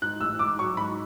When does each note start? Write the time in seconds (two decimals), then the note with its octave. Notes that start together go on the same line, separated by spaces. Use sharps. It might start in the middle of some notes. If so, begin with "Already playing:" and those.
0.02 G#2 F#6
0.20 A1 E6
0.39 G#2 D6
0.59 F#3 C#6
0.77 G#2 B5